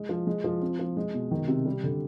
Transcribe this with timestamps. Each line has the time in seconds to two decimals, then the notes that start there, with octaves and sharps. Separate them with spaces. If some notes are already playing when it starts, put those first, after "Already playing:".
Already playing: G#3
0.09 F3
0.27 G#3
0.44 F3
0.62 C4
0.79 F3
0.97 G#3
1.14 B2
1.31 D#3
1.48 C3
1.66 G3
1.83 D3